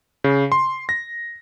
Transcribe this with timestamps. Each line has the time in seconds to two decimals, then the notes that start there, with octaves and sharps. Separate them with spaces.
0.24 C#3
0.52 C6
0.89 A#6